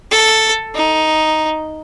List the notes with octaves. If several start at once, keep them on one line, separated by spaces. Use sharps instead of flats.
A4
D#4